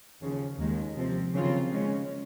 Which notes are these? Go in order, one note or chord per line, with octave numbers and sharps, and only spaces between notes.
D#2 C#3 F3
D#2 D#3 G#3
C3 F3 C4
D#2 C#3 F#3 C4 F4
C#3 G#3 C#4